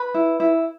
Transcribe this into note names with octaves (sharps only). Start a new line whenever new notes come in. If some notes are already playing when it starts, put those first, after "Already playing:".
Already playing: B4 B5
E4
E4